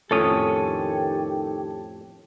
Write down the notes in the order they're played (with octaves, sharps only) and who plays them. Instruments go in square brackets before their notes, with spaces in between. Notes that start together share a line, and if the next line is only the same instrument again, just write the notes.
[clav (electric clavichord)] F2 A2 C#4 [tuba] D#3 [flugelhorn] G4 [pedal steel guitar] A4 C#5 D#6